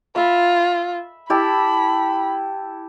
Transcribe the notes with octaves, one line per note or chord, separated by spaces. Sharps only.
F4 E5 B5
E4 G4 A5 B5